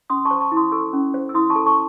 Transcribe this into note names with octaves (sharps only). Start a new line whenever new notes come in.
C#4 C6 D#6
A5 C#6
C5
A5 C#6
E4
C6 D#6
A4 C#6 E6
C#4
C5
E6
E4 C6 D#6
A5 C#6
A4
A5 C#6